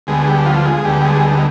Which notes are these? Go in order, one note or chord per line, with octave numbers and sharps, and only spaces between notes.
D2 D3 G3 G#3 B3 G#4
G3 G4
F3 F4
G#3 G#4
D2 D3 G3 B3 G4
G#3 G#4
D#4